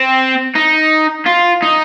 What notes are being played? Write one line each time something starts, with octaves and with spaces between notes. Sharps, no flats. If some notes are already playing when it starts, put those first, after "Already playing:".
Already playing: C4
D#4
F4
D#4